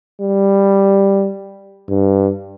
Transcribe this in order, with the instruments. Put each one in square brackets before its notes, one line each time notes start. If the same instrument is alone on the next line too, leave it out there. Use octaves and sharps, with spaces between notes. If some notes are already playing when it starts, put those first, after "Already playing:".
[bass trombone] G3
G2